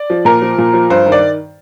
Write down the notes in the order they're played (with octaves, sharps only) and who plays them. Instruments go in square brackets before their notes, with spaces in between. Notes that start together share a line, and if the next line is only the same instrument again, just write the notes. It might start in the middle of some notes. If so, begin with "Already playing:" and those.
Already playing: [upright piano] D5
F3
A#2 A#4
F3
A#2
F3
G2 C5
D#3
D5